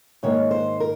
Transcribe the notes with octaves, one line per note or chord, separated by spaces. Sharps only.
G#2 D#3 A#3 C#5
C5
A#4